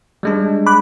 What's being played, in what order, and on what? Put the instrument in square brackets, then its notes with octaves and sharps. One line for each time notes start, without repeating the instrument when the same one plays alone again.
[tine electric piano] G3 G#3 D4
[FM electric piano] B5 D6 F#6